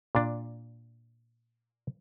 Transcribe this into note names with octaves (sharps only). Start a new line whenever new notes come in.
A#2 D4